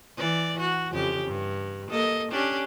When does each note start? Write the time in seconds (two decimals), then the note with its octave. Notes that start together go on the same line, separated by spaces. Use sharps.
0.18 E3 D5
0.60 F#4
0.91 F2 C#3 G4
1.26 G2
1.90 A#3 A4 D#5
2.32 C#4 D4 G4